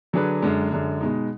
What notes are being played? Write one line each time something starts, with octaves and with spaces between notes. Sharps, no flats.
D3 F#3 D4 G#4 B4
F#2 D3 G#3
F#2 D3 G#3
B2 G#3 D#4